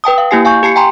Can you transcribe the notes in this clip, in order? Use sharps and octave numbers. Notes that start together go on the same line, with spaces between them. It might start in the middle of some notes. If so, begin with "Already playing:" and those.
B4 G5 A5 D#6
F5
A#3 E4 G4 G#5 C7
F5 G#5 C#6 G6
G4 A5 C7 C#7
G5 G#5 A#5 C6